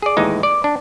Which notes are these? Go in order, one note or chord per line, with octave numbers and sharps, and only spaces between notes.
G#4 D5
D#2 A2 E3 G#3 D#4
D5
D4